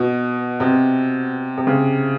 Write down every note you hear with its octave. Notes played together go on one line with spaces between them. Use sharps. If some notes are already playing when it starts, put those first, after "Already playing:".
Already playing: B2
C3
C3
C#3